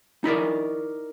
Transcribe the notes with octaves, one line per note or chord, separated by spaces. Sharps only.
D#4 E4 A#4 D5